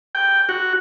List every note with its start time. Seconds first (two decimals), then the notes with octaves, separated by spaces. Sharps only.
0.15 G5
0.49 F#4